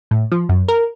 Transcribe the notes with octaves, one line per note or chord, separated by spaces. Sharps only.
A2
F3
F#2
A#4